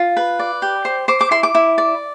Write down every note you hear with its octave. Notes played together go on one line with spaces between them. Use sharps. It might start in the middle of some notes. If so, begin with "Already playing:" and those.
Already playing: F4
B4
D5
G4
C5
C5 D6
D6
E4 C6
D6
E4
D5